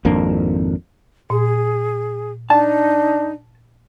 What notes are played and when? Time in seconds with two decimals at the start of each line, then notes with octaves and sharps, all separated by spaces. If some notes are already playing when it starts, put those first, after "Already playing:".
0.05 G#1 F2 A#3 D4
1.30 A#2 G#4
2.50 D4 D#4 A5